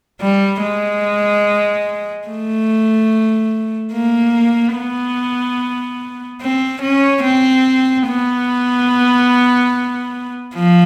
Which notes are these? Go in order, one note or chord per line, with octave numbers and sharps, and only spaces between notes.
G3
G#3
A3
A#3
B3
C4
C#4
C4
B3
F3